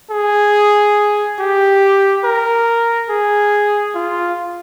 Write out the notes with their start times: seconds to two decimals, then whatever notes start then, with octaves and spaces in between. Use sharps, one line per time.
0.10 G#4
1.39 G4
2.24 A#4
3.09 G#4
3.94 F4